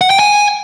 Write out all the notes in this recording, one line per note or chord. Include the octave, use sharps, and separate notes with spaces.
F#5
G5
G#5